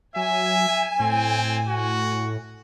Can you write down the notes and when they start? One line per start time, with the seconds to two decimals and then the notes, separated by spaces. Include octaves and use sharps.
0.16 F#3 E5 G#5
1.00 A2 C4
1.68 F#4